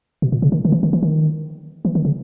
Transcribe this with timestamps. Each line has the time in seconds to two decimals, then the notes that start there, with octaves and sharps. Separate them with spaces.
0.22 B2
0.32 A#2
0.42 C#3
0.52 D#3
0.65 D#3
0.72 E3
0.83 D#3
0.93 E3
1.03 D#3
1.85 E3
1.95 D#3
2.05 C#3